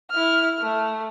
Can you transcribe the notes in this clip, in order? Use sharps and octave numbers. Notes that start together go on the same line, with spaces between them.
E4 F6
A3